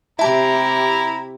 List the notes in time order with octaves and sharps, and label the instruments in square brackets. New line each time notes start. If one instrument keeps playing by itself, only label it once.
[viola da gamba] C3 G4 [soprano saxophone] E4 [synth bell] E5 A5 [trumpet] A#5